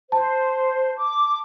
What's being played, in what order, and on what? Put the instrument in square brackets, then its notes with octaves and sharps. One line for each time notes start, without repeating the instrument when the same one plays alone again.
[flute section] C5 [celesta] A5
[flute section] D6